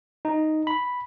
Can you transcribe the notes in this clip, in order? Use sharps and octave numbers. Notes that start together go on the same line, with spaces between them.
D#4
B5